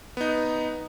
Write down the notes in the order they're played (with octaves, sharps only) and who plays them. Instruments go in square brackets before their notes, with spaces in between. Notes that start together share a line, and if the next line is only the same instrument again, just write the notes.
[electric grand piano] B3 D#4